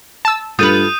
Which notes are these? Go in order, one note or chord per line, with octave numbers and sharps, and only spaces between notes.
A5 E6
G2 F4 A4 B4 D#6 G6 D#7